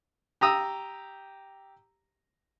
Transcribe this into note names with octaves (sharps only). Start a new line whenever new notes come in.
G4 A#5 D#6 E6